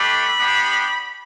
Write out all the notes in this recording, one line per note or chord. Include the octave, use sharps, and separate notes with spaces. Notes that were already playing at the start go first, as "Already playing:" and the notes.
Already playing: A3 D4 G4 B5
B3 D4 G4